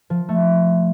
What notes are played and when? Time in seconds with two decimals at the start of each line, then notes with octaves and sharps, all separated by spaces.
0.10 F3
0.29 A3